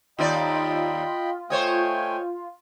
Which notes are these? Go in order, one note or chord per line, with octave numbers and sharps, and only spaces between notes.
D#2 D#4 F4 D5 D#5 G5 B5
A3 C5 C#5 D#5 G5 G#5